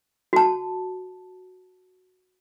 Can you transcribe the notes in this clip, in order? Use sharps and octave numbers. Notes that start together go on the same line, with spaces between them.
F#4 A5